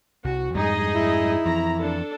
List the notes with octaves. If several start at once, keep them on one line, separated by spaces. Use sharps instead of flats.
C2 F#4
F2 G#2 G3 D#4 G#4 D#5
E4
F2 E3 A#5
D4 A4